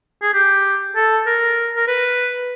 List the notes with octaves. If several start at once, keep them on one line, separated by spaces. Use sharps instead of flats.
G#4
G4
A4
A#4
A#4
B4